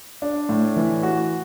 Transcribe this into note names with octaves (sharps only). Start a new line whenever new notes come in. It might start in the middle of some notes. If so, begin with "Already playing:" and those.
D4
A2
E3
F#4